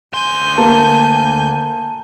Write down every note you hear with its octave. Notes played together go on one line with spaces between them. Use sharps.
D2 G#5 C6 G6
A#3 A5